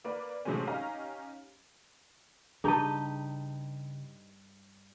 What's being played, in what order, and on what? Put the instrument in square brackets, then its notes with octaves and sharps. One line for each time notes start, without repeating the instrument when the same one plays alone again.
[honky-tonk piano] A#3 A#4 B4 D5
A2 C3 F#3 G#3 C4 C#4
C#4 D#4 G4 F5 A#5
[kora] G2 D#4 G4 [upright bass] C#3 [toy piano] G#4 A5